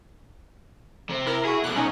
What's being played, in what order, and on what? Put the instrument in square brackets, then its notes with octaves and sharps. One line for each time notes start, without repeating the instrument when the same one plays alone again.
[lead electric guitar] C3
[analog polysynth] E4 A#4
[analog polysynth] E4 F#4 [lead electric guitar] G#4
[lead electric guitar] C2 B2 [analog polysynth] D6 F#6
[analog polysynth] C#4 D#4